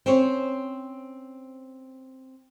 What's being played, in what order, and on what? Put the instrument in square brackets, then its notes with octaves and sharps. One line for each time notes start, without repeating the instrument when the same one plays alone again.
[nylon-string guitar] C4 C#4 C5 C#5